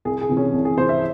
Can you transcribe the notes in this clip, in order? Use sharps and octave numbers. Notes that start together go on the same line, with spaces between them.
C2 G#4
G#4
C3 E3
C#4
C2
G#4
C3 E3 C5
E5